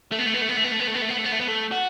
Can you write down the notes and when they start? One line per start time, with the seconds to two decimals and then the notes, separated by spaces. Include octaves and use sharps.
0.12 A3
0.19 B3
0.26 A3
0.34 B3
0.42 A3
0.49 B3
0.57 A3
0.64 B3
0.72 A3
0.80 B3
0.87 A3
0.94 B3
1.02 A3
1.09 B3
1.17 A3
1.24 B3
1.32 A3
1.40 B3
1.47 A3
1.71 F#4